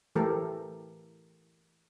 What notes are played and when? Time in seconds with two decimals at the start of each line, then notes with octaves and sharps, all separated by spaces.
0.15 E3 A3 G4 A4 A#4